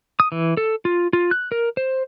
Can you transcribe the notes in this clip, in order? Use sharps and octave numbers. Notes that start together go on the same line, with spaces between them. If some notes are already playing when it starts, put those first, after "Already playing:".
D#6
E3
A4
F4
F4
F#6
A#4
C5